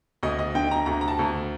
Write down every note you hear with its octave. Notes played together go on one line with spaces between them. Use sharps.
D2 D#5
D#5
D3 G5
A#5
D2 A#5
A#5
A5
D2